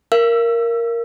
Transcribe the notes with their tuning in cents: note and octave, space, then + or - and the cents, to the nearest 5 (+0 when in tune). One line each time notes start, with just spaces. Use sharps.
A#4 +0 F5 -45 E6 +25